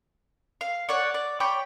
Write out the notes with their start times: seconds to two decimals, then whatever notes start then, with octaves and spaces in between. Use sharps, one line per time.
0.61 F5
0.89 C#5 D5 F#5
1.14 D5
1.40 C#5 G5 B5 D6